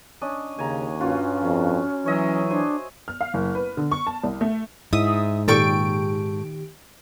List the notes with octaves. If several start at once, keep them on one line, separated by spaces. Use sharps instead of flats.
C#4 D4 D#5
D#2 C#3 G#5 A#5
G2 C#4 F4 F#4
F2
E3 F#3 C#5 D#5 E5
D4 C5 G#5
F6
F5
F#1
B4
D3
C#6
A5
C2
A3
G#2 E4 E5 D#6
A#2 D#3 G4 A4 G5 C#6 D7